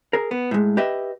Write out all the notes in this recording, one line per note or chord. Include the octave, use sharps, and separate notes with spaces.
G#4 A#4
B3
A2 G#3
G4 B4 D#5 E5